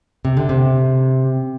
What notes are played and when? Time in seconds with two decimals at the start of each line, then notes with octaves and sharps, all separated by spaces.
0.25 C3
0.37 D3
0.49 C3